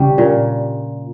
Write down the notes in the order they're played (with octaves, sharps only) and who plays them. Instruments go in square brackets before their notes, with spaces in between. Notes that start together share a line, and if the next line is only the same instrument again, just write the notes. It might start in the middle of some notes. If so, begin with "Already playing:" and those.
Already playing: [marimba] C#3 C#4 [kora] G3 D4 G4
[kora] A#2